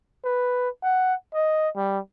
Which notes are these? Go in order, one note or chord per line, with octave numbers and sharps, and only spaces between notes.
B4
F#5
D#5
G3